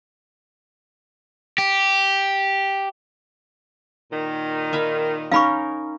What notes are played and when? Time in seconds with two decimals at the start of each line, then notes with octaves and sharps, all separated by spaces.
1.58 G4
4.11 A#2 D#3
4.73 E5 F5 B5
5.32 C#4 D#4 A#4 F5 B5 C#6